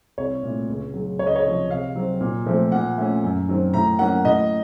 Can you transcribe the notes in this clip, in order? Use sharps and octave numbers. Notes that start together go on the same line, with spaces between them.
C2 C#5
A#2 A3
C#2
C#3 F#3
C#2 C#5
D#5
C#5
C3 F3
C3 F5
F#3 C4
A#2
F3 A3 C4
A#2 F#5
A3 C#4
F#2
D#3 F#3 C4
A2 A#5
F#3 A#3 C#4 F#5
A2 D#5